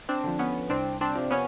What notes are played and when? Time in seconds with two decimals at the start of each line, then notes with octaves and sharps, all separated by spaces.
0.09 C4 D4
0.24 D3 F3
0.39 B3 C#4
0.70 C2 C4 D4
1.01 C4 D4
1.15 C3 F3
1.30 B3 C#4